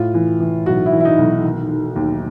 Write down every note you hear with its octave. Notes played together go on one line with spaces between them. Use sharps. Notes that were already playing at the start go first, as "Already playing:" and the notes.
Already playing: A2 F4
E3
E3
B1 F#4
E4
E3
E4
D#4
B1
D#3
D#3
D#2